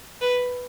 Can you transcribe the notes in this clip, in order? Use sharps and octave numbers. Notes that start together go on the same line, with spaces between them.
B4